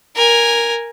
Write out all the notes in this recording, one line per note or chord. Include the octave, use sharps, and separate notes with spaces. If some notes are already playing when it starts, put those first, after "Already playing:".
A#4 G#5